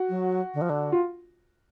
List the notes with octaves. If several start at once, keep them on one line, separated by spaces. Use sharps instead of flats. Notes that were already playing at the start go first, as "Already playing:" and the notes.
Already playing: F#4
F#3
D3
F3
D3
F4